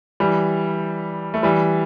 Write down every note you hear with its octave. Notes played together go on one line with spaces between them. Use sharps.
E3 G3
A3
E3 G3